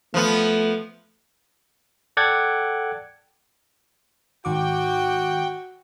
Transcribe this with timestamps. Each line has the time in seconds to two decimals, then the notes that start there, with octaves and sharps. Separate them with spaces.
0.14 F3 A3 B3
2.17 A4 D5 F#5 G5 D6 G#6
4.45 G#2 D#3 F#4 G5 D6